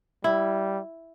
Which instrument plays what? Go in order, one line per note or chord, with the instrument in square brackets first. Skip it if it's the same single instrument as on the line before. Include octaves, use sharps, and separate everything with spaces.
[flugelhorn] G3 [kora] E4